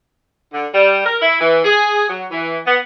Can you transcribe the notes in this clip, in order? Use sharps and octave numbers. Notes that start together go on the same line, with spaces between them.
D3
G3
A#4
E4
E3
G#4
F#3
E3
B3